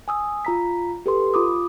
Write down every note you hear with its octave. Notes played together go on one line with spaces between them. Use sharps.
G#5 D#6 E6
F4 A#5 B6
G4 A4 B4 C6
F4 B5 D6 D#6